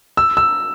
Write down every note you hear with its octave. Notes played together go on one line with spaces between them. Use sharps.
E6
E6